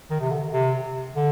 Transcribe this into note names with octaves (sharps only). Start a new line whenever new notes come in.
D#3
C3
D3
C3
D3